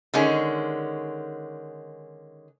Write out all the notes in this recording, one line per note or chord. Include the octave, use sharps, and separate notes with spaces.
D3 D#3 G#3 C#4